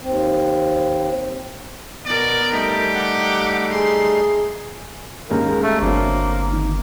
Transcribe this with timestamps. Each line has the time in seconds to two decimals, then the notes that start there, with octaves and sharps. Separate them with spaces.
0.01 D#2 C4
2.06 B2 B3 A#4 D5
2.52 G3 A3 D#4 G4
2.94 F#5 D6
3.70 G#4 C6
5.30 D#2 G#2 C#3 A#4
5.63 A3
5.81 G1 F#3 A#3 C4 D4
6.52 D#3